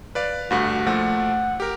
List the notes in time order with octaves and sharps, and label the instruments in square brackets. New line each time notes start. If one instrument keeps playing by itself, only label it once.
[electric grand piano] B4 D5 F5
[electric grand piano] D2 G2 A3 [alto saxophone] F#4
[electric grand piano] A#2 F3 A3 [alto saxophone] F#5
[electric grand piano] G4 A#4